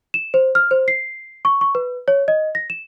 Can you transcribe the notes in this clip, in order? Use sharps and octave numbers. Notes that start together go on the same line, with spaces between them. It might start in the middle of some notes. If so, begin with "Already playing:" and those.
E7
C5
F6
C5
C7
C#6
C#6
B4
C#5
D#5
A#6
E7